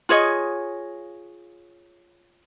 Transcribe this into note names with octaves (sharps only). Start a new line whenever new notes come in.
F4 G#4 C#5 D#5